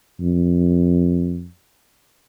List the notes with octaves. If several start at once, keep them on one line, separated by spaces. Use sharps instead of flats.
F2